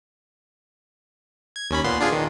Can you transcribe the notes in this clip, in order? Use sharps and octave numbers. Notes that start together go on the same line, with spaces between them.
G#6
D#2 C#4 B5
A#2 B3 C6
D4 F4 G#4
D#3